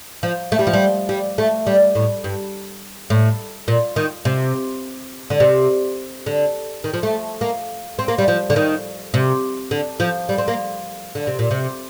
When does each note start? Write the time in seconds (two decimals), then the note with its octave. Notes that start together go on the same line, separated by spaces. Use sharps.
0.23 F3
0.52 A3
0.59 G3
0.67 F3
0.73 G3
1.09 G3
1.38 A3
1.67 G3
1.95 A2
2.24 G2
3.10 A2
3.68 A#2
3.96 D#3
4.25 C3
5.30 D3
5.40 C3
6.26 D3
6.84 D#3
6.94 F3
7.03 A3
7.41 A#3
7.99 C4
8.08 A#3
8.18 G3
8.28 F3
8.50 D3
8.56 D#3
9.14 C3
9.71 D3
10.00 F3
10.29 G3
10.38 C4
10.48 A#3
11.15 D3
11.27 C3
11.39 A#2
11.51 C3